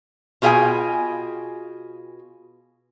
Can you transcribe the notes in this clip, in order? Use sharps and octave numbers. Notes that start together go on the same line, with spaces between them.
B2 F4 G#4 F5 G5 G#5